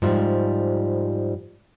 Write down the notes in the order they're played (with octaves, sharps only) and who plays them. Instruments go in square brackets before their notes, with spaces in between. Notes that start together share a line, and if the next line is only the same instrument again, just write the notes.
[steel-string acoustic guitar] G#2 F3 G3